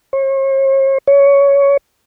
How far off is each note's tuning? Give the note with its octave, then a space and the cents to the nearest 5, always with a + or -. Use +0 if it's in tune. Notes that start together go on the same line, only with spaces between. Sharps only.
C#5 -45
C#5 +15